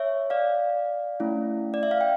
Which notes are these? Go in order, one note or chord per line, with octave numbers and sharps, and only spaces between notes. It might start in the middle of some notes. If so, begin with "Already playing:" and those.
Already playing: C#5 E5
D5 F5
A3 C#4 E4
D5
E5
F5
G5